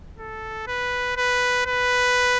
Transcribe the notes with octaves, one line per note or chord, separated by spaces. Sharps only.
A4
B4
B4
B4